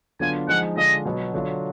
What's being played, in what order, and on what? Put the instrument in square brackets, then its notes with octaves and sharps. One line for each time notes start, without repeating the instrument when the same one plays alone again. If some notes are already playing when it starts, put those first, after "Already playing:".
[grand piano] D3 F#3 B3 D4 F4 [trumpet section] G#5
[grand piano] F3 G#3 D#4 [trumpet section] F#5
[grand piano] D3 G#3 D4 F4 [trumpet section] D#5
[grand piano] B2 F#3 B3
D3 F#3 D4 F4